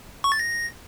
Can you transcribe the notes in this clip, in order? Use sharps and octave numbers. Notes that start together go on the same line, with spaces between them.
C#6
A6
A#6